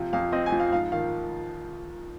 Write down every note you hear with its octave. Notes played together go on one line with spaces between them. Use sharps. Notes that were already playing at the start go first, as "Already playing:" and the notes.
Already playing: C3 F3
F2 F5
C4 D#5
G#5
F3
F5
G#2 F5
D#3 F5